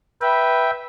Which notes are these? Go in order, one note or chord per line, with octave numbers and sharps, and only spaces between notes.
B4 E5 G5